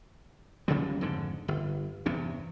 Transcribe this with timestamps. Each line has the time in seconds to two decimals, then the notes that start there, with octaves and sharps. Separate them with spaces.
0.68 C#2 C#3 F#3 G3
1.01 F2 G#2 D3
1.48 G1
2.06 E2 G2 C3